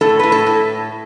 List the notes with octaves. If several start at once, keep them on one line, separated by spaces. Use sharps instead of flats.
A2 A4
A2 B4
A4
A2